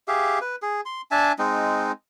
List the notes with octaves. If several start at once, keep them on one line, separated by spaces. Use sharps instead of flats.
G4 G#4 E5 F5
B4
G#4
C6
D4 E5 G#5 A5
G#3 C4 D#4